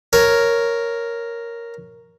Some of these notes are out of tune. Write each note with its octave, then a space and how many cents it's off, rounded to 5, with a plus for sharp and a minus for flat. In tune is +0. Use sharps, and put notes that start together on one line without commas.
A#4 +0 C#5 +0